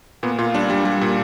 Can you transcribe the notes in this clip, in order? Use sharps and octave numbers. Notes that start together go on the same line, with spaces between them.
A#2 B3
A#2 F4
G3 D4
G3
G3
A#2